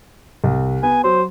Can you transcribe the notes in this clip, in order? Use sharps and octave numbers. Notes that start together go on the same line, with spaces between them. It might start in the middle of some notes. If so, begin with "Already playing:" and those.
C2
B3 G#5
F#3 C5